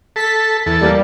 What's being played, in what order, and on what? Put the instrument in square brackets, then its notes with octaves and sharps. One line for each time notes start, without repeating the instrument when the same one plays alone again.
[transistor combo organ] A4 [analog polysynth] B6
[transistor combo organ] E2 A4
[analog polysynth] G3 A#3